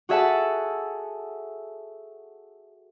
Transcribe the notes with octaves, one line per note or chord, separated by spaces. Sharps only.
F#4 G#4 A4 E5 F#5 A5